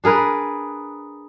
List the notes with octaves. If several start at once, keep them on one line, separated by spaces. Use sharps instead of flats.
D4 G#4 A#4 B4